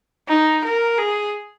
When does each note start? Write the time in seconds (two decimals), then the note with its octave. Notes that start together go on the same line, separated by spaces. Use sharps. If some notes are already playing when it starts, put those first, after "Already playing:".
0.28 D#4
0.64 A#4
0.98 G#4